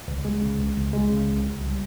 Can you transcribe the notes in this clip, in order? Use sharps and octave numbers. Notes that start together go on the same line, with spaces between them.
C#2
G#3
C#3
C#2
C#2
G#3
C#3
C#2
C2
G3